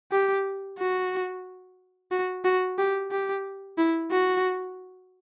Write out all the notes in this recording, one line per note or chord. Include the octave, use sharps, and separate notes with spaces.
G4
F#4
F#4
F#4
G4
G4
E4
F#4